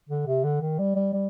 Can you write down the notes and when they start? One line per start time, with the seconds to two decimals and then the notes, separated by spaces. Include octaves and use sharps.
0.09 D3
0.26 C3
0.44 D3
0.61 D#3
0.79 G3
0.96 G3
1.13 G3